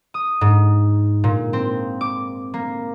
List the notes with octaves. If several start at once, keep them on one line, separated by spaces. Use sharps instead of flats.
D#6
G#2
A#2
C4
D6
A#3